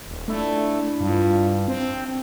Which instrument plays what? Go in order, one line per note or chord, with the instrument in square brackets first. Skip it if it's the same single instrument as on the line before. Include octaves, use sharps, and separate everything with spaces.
[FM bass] D#1
[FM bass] A3 [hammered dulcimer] D4 E4
[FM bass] G2 [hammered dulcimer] F4
[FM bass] C4